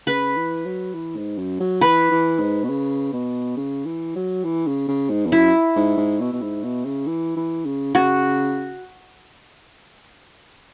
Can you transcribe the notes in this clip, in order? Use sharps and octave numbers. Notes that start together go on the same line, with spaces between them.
C#3 B4
E3
F#3
E3
G#2
F#2
F#3
E3 B4
E3
G#2
B2
C#3
B2
C#3
E3
F#3
E3
C#3
C#3
G#2
E2
F#2 E4
G#2
G#2
B2
B2
G#2
B2
C#3
E3
E3
C#3
C#3 F#4